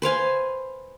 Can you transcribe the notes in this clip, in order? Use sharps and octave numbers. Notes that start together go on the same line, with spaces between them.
B4 C5 F5 G#5